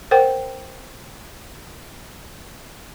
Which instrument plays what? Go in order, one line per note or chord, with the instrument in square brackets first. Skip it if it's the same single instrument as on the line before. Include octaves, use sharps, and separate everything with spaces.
[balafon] A#4 C5 F#5 G5